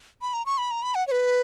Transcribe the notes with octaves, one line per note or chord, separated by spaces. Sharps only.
B5
A#5
C#6
B5
A#5
B5
F#5
C#5
B4